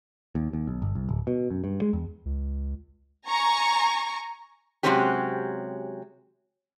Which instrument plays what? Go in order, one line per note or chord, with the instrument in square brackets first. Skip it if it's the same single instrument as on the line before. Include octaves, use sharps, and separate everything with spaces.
[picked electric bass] D#2
D#2
B1
G1
C2
D1
B2
F#2
G2
G#3
E2
[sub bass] C#2
[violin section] G#5 A#5 C#6
[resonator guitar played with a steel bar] C3 F#3 G#3 C4 C#4 G4